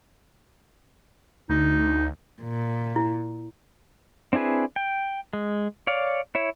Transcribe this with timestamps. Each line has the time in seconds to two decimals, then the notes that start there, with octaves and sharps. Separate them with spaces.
1.49 D2 D#4
2.42 A#2
2.96 E4
4.33 C4 D4 E4 G#4 B4
4.76 G5
5.33 G#3
5.87 C#5 D5 F5
6.35 E4 C#5 E5